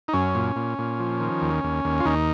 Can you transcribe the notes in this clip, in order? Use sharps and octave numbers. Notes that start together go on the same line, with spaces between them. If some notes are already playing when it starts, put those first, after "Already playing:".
D#4
F#2 C#4
A#2
A#2
A#2
F3
D#3
D#2
D#2
D#2
F4
D#2 D#4